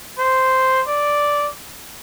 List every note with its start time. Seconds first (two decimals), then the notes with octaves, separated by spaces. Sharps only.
0.19 C5
0.87 D5